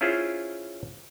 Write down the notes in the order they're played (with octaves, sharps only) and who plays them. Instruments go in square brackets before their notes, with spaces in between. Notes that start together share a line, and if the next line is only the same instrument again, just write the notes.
[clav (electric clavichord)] C#4 E4 F4 G#4 C5